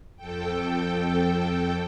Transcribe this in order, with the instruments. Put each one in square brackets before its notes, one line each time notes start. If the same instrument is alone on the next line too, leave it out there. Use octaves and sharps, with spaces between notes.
[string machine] F2 A4 G5